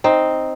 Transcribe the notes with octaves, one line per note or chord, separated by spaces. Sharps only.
C4 D#4